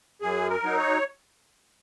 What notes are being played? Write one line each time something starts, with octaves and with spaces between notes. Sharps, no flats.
F#2 G#4
A#4
F#3 D#4
C#5